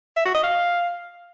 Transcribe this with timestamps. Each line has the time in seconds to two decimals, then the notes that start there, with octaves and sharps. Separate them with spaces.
0.16 E5
0.25 F#4
0.34 D#5
0.43 F5